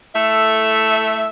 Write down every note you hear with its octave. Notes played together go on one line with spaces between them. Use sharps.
A3 E4 A4 E5